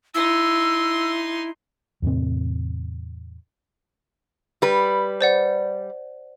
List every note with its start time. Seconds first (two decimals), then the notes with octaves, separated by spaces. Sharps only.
0.15 D#4 E4 C6 E6
2.02 E2 A2 C3 C4
4.62 G3 B4
5.21 C5 D5 F#5